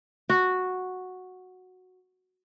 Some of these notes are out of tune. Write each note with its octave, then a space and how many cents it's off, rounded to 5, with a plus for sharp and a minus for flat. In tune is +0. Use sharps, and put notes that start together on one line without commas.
F#4 -5